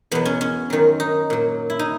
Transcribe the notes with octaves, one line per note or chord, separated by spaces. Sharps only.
E2 B2 F#3 B3
C#4
C#4
F#2 D#3 F#3
D#4
A#2 F#3
E4
D#4